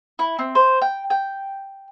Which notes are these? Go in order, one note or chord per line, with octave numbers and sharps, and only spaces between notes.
E4
C4
C5
G5
G5